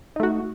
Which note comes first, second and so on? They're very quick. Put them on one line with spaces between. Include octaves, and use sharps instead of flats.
D#4 A3 F#4